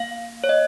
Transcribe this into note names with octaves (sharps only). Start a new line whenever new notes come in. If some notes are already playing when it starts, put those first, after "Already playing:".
Already playing: A#3 F5
C#5
D#5